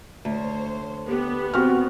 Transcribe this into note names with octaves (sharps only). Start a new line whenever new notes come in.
D2 C5 C#5
B3 G4
C4 F#4 G5 F6